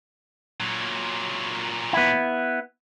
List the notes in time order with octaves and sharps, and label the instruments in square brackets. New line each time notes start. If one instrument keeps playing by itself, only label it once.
[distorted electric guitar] A#2 F#3
[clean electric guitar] B3 E4